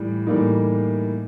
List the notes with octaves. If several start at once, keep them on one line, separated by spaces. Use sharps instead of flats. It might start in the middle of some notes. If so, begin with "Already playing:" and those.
Already playing: A2 E3 G3
A2 E3 G3 A#3 D#4